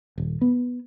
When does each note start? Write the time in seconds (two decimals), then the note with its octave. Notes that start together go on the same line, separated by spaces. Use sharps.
0.18 D#1
0.41 B3